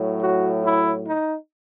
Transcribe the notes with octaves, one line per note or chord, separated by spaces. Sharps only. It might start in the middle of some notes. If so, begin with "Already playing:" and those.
Already playing: A2 F#3
F#4
E4
D#4